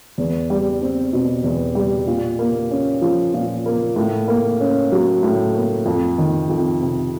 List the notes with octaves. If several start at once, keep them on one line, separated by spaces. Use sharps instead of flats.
E2
G3
C4
B2
E2
G3
A#2
A#3
C#4
F3
A#2
A#3
A2
A#3
C#4
F#3
A2
A#3
F2
D#3
F2
C3